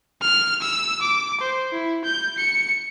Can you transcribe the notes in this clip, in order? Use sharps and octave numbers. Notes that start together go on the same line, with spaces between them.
F6
E6
D6
C5
E4
G6
C#7